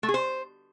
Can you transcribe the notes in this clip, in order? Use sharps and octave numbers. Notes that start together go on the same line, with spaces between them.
A3
G#4
C5